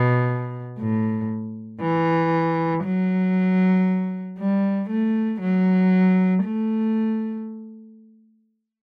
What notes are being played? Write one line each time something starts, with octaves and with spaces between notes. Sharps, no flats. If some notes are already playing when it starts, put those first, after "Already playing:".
Already playing: B2
A2
E3
F#3
G3
A3
F#3
A3